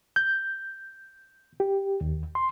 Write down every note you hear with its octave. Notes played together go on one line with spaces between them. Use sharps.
G6
G4
D#2
C6